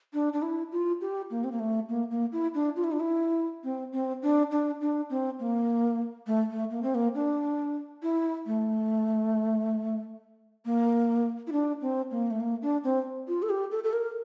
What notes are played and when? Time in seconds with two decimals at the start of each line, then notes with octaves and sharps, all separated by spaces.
0.14 D4
0.33 D4
0.42 E4
0.72 F4
1.01 G4
1.30 A#3
1.44 C4
1.52 A#3
1.59 A3
1.89 A#3
2.10 A#3
2.32 E4
2.54 D4
2.76 F4
2.84 E4
2.92 D4
3.00 E4
3.64 C4
3.92 C4
4.22 D4
4.51 D4
4.81 D4
5.10 C4
5.39 A#3
6.27 A3
6.51 A3
6.71 A#3
6.83 C4
6.95 A#3
7.15 D4
8.03 E4
8.46 A3
10.65 A#3
11.47 E4
11.52 D4
11.82 C4
12.11 A#3
12.31 A3
12.40 A#3
12.62 D4
12.84 C4
13.28 F4
13.42 A4
13.50 G4
13.71 A4
13.84 A4
13.93 A#4